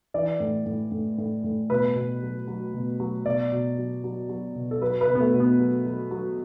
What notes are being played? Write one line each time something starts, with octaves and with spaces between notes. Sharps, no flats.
E3 D5
A2
A2
A2
A2
A2
B2 B4
B2
F#3
F#3
B2
F#3
B2 D5
B2
F#3
F#3
F#3
B2
A4
F#3 B4
B4
B2
B3
A3
B2
B3
F#3
F#3
F#3